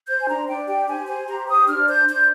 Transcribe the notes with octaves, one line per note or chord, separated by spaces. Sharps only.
C5 G6
G#5
D4 A#5
D4 G5
G4 G5
C5 G#5
C5 G#5
G4 A#5
C5 D#6
D4 F6
C5 G6
D4 G6